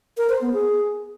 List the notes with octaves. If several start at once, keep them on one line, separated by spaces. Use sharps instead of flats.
A#4
C5
B3
G#4